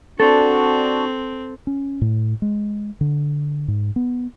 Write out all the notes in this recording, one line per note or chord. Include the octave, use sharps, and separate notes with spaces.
C4 D4 F#4 A4
C#4
A2
G#3
D3
G#2
B3